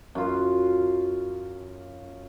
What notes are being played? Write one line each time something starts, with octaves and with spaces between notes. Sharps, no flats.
F#2 F4